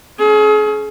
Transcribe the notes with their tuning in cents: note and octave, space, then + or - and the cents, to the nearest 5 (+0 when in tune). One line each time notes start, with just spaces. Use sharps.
C#4 -10 G#4 +35